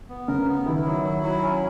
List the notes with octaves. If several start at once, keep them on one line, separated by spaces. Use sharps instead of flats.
B3
C#3 A#4
B3
D#3 E4
F#3
E4
F#3
C#4